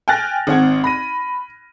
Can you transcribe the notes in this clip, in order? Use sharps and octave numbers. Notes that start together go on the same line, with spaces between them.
G5 G#5 F6 F#6 A6 A#6
G#1 C4 F#5 G#6
B5 A#6 D#7